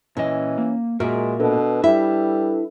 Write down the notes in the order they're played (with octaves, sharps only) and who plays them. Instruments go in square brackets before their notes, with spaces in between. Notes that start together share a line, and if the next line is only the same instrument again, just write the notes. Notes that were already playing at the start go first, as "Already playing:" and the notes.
[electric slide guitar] A#2 D#5 [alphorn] E3 [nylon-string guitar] C#4
[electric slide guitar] A#3
[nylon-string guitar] A#2 [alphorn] G#3 [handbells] F#4 [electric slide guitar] A#4 E5
[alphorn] B2 [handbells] D4 A4 B4
[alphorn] G3 [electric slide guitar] E4 [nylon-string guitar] E5